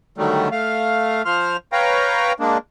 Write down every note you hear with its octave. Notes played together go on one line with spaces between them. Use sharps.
D3 D#3 F#3 G3 A3
A3 F5
F3 C5 F6
B4 C#5 F5 G5 A#5
G#3 A#3 D4